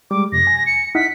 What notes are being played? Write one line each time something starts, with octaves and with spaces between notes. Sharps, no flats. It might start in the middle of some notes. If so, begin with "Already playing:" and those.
G3 G#3 D6
F2 C3 A#6
G#5
C#7
D#4 E4 F#5 B6